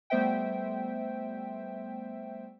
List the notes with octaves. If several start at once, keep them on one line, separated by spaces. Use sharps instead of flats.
G3 A3 B3 C5 E5 G5